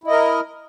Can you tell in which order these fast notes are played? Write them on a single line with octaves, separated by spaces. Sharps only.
E4 D#5 A#4